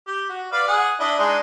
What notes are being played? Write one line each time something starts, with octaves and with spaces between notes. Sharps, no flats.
G4
F#4
B4 D5 F5
G#4 F#5
D4 E4 D#5
G#3 D4 D#4